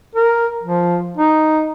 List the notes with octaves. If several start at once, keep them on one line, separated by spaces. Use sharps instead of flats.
A#4
F3
D#4